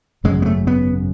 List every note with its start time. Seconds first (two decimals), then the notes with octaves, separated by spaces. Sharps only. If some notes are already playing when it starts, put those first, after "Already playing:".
0.24 G#1 F#2 C#3 G#3
0.42 B3
0.46 A3
0.67 B3